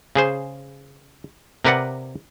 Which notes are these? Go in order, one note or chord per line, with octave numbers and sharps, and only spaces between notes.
C#3 G#4 C5
C3 A#4 B4 D5 F#5